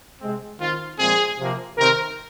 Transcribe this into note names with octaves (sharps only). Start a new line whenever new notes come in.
C3 G#3 C4
D#3 C4 F4
A#2 F3 G#3 C4 G#4
C3 F3 A#3
C3 D#3 C4 A#4